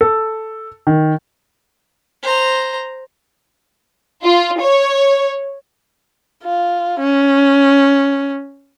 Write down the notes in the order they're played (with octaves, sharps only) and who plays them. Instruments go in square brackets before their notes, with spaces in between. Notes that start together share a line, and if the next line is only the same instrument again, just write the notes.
[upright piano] A4
D#3
[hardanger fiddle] C5 A#5
[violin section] F4
C#5
[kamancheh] F4
C#4